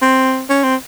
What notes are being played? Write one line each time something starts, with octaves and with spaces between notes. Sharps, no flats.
C4
C#4
C4